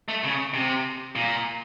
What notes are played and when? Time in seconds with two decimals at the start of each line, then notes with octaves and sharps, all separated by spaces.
0.08 A3
0.24 C#3
0.54 C3
1.16 A#2